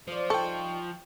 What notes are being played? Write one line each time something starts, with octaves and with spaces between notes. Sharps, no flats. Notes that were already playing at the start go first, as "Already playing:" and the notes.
F3 C5 D5
G3 D#4 A4 G5 C#6